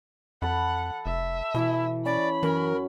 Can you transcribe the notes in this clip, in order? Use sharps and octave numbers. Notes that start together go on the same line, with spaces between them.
F2 A4 F#5 A5 B5
F1 E5
B2 E3 E4
C#4 D5 B5
F#2 E3 C#4 A#4